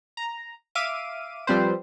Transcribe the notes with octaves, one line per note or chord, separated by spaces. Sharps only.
A#5
E5 F5 D6 D#7
F3 G3 C4 B4 C5